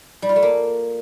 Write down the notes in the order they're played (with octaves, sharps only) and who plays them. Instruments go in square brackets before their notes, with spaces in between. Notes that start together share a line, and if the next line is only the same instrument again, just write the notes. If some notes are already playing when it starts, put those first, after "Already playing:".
[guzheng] G3
F4
A3
A#3